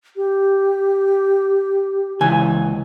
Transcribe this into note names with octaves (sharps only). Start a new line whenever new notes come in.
G4
C#2 E3 G#5